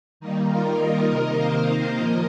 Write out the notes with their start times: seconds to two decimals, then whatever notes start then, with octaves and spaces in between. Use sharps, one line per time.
0.20 D#3 G3 A#3 D#4
0.49 F4 A#4
0.79 A#4 D#5
1.08 C3 D#3 A#3 A#4 D#5
1.37 C5 F5
1.67 A#4 D#5
1.97 A#2 F3 A#3